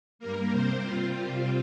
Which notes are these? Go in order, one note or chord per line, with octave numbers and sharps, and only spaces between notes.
G2 G3 A#3 A#4
C3 G3 C4 C5
C3 G3 C4 F4